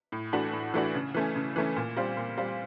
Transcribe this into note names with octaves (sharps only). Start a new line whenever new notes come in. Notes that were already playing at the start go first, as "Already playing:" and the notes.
A2
E3 A3 D4 F#4
A2
E3 A3 D4 F#4
C#3
E3 A3 C#4
C#3
E3 A3 C#4
A#2
G3 C4 F4
A#2
G3 C4 F4